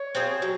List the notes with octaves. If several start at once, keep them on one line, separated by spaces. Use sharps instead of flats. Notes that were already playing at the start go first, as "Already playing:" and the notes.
Already playing: C#5
C4 F4 G#4
F#3